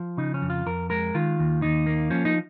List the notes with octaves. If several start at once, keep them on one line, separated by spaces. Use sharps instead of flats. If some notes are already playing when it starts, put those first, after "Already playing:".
Already playing: F3
C#3 D#4
C#4
F2
F4
F2 A#4
G#3 A#4
D#3 F4
D#2
D#2 D#4
A#3
F3 C#4
D#4